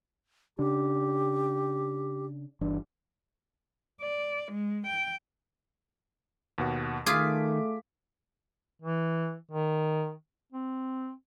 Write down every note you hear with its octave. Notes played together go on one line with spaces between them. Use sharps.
C#3 D4 G4
G1 E3 D4
D5
G#3
G5
D#2 B2 F#5
D#3 A3 F4 G#4 D6 B6
E3
D#3
C4